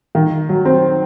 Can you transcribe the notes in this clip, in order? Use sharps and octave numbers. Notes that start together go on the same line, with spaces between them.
D#3
F#3
C4